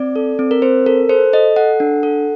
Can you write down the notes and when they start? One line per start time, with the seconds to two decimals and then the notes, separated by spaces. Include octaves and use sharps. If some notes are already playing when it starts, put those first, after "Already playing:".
Already playing: C4 D5
0.16 A4
0.39 C4
0.51 A#4
0.62 C4 C5
0.86 A4 A#4
1.09 A4 C5
1.33 A4 D#5
1.56 A4 F#5
1.80 D4
2.03 A4